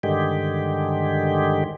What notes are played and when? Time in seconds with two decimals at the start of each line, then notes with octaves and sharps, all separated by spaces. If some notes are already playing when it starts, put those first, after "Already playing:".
0.03 G2 D3 D#3 G#3 G4